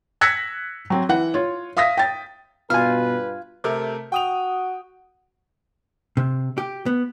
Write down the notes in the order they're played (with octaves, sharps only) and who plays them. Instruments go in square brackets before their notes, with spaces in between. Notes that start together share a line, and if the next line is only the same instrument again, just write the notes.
[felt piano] E6 F#6 G#6 A#6 B6 C#7
F#3 C4
E3 F#5
F4 C#5
E5 F5 D#6 A#6 B6
G5 A6
[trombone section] G2 B4 [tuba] B2 [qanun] F4 [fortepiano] G#5 F6
[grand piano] C3 A3 A#4
[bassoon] F#4 [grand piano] G5 D#6 F7
[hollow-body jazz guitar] C3
G4
B3